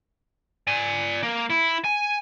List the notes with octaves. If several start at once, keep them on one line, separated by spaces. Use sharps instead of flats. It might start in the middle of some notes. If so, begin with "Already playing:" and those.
D5 G#5
A#3
E4
G#5